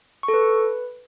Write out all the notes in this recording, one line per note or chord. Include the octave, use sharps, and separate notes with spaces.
C#6
A4
B4